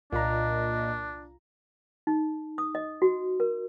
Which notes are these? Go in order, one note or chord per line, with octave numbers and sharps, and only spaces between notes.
C2 A#2 D4 F4 D#5 A#5
D#4
D#6
D#5
F#4
A#4